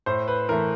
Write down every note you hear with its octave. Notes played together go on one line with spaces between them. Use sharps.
A2 C5
B4
E3 A3 A#4